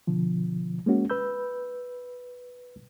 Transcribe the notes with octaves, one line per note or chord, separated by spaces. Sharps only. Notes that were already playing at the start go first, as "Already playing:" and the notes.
B2 D3 F3
G#3 A#3 C#4 F#4
B4 B5 E6 G6